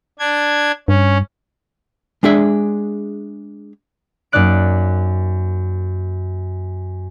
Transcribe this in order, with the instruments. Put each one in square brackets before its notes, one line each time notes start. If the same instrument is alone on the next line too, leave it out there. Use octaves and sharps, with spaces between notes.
[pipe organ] D4 G#6
[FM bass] G2 [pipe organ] C#4
[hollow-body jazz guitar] G#3 D4 G#4 E5
[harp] F#2 A#3 D#4 D5 F#6 D7